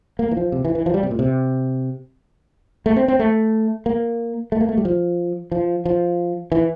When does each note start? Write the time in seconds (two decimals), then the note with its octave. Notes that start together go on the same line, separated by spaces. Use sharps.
0.19 A#3
0.31 E3
0.37 F3
0.52 C3
0.65 E3
0.75 E3
0.86 F3
0.94 G3
1.03 C3
1.11 A#2
1.19 C3
2.86 A3
2.96 C4
3.08 C4
3.19 A3
3.86 A#3
4.52 A3
4.61 A#3
4.69 A3
4.78 G3
4.85 F3
5.52 F3
5.85 F3
6.52 E3